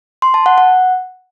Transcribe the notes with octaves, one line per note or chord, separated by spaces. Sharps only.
C6
A5
F#5
F#5